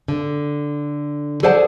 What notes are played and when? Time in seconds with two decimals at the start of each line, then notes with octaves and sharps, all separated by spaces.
0.08 D3
1.43 G#4 A4 C5 D5 F#5 A5